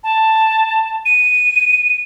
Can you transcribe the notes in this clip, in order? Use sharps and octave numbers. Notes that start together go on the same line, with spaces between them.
A5
D#7